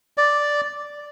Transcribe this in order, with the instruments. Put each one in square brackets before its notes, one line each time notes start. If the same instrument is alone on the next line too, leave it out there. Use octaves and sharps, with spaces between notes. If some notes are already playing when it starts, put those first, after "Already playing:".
[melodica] D5